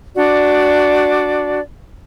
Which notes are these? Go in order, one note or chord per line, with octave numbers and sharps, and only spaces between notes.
D4 F#4 D5